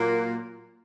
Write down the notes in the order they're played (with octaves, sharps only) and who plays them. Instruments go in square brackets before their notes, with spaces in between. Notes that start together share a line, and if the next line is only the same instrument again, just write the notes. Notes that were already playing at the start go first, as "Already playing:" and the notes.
Already playing: [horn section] A#2 F#3 A#3